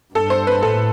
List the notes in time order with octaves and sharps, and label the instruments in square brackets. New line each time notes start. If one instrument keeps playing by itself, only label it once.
[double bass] G2 [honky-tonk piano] A4
[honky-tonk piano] C5
B4
[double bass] A2 [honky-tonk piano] A4